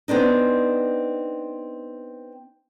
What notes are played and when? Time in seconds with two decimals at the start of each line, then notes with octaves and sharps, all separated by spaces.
0.08 B3 C4 D4 D#4